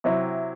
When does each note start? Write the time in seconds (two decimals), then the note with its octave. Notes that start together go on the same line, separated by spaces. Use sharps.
0.04 C3 F#3 C4 E4